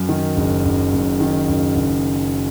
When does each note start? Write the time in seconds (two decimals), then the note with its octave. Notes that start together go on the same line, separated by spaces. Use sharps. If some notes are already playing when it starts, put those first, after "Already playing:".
Already playing: F#2
0.09 D#3
0.36 F#1
0.65 F#1
0.92 F#2
1.20 D#3
1.48 F#1
1.76 F#1